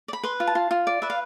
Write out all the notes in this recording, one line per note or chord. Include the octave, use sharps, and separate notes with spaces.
D5
B5
B4 C6
F4
A5
F4
F4
D5
B4 E5
F5